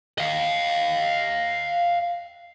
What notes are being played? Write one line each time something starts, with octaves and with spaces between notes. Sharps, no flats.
D#5 F5